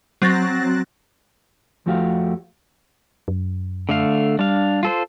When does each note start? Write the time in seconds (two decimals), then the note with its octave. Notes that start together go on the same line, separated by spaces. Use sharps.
0.22 F#3 C4 F#6 A6 A#6
1.86 F2 F3 A3 F#4 G4 F5
3.28 F#2
3.89 D3 A3 F5
4.39 G3 D4 F5
4.83 F4 A4 C5